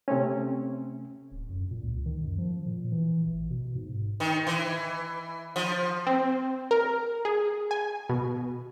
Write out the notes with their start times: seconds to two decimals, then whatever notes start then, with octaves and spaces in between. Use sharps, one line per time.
0.08 C3 A3 C4 C#4
1.32 D1
1.50 F#2
1.71 A#2
1.83 C#2
2.06 D#3
2.25 F#2
2.38 F3
2.66 A#2
2.92 E3
3.27 A1
3.51 B2
3.75 G#2
4.20 D#3
4.47 E3
5.56 F3
6.07 C4
6.71 A#4
7.25 G#4
7.71 G#5
8.09 B2